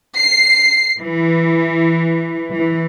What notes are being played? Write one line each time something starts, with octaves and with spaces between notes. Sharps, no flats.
C7
E3
E3